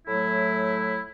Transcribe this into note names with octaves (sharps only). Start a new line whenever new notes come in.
A2 F#3 A3 E4